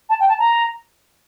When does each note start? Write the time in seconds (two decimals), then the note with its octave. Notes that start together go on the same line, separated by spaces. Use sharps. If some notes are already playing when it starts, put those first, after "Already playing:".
0.10 A5
0.20 G5
0.29 A5
0.39 A#5